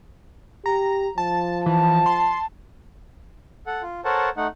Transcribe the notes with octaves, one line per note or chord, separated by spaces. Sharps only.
G4 A#5
F3 A5
E3 A5
C6
A4 F#5
F4
A4 A#4 C5 C#5 F#5 A5
A3 D#4 F#5